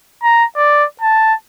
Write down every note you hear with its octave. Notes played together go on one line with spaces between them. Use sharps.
A#5
D5
A5